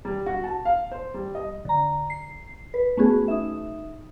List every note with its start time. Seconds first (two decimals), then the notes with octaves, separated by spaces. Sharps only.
0.05 G3
0.26 F#4
0.44 A5
0.65 F5
0.92 C5
1.14 G3
1.35 D#5
1.65 D3 A#5
2.10 C7
2.74 B4
2.97 A3 B3 C#4 F#4 G#4
3.28 D#4 E5